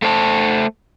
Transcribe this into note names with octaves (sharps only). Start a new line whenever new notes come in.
A3 A4 C5 G#5 A5